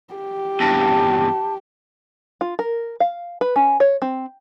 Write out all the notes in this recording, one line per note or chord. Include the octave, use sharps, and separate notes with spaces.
G4
E2 G2 A5
F4
A#4
F5
B4
C#4
C#5
C4